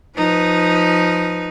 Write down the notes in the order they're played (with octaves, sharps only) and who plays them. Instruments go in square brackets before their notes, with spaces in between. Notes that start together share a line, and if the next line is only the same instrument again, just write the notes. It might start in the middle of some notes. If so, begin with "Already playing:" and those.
[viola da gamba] F3 D#4 B4